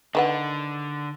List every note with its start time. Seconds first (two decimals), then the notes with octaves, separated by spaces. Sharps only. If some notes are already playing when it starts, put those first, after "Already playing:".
0.15 D3 D#3 B4 F#5